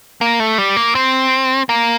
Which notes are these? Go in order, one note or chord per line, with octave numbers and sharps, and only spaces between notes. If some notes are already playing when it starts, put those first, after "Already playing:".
A#3
A3
G3
A#3
C4
A#3